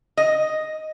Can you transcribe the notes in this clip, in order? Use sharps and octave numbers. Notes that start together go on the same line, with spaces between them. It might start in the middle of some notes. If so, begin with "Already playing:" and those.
D#5